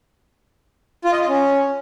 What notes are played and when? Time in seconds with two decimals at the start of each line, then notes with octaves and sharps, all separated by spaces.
1.05 F4
1.12 D#5
1.20 F4
1.28 C#4